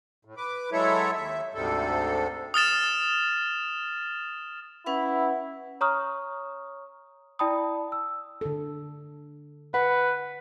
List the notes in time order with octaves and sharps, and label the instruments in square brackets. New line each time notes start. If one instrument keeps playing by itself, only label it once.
[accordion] A2
B4 D6
F#3 G#3 E4 A4 C#5 E5
D#2 E5
D2 G#2 C3 G3 A4
[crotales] D#6 F6 A6 E7
[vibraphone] C#4 B4 F#5 [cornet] E4
[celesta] C#5 A#5 C#6 D#6 F6
E4 D5 G5 A5 B5 D#6
E6
[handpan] D3 A4
[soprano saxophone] B4 [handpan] F#5